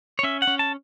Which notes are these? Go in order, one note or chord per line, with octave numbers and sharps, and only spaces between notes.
C#5
C#4 E5
F#5
C#4
A5